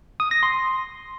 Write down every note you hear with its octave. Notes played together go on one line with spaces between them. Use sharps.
D#6
A#6
C6